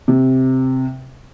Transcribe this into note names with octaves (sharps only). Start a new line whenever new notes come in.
C3